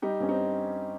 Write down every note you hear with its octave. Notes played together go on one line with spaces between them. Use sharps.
G3 D#4 G4
G2 C#4
C4 D#4